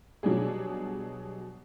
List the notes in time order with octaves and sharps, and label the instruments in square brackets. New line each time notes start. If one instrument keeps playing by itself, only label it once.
[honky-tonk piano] B2 F#3 G3 D4 G#4